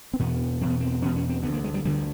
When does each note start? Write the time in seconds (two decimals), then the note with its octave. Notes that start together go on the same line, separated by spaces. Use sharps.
0.13 C4
0.19 E2 B2 B3
0.61 E2 C4
0.65 B2
0.70 B3
0.81 C4
1.02 E2 B2 C#4
1.16 C#4
1.29 C4
1.43 D2 D3 B3
1.54 A#3
1.64 G#3
1.74 G3
1.85 D2 D3 G3